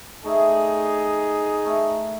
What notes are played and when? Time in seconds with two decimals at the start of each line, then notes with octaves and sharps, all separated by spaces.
0.24 A3 D#4 G#4 D5 E5
1.65 A3 A4 A#4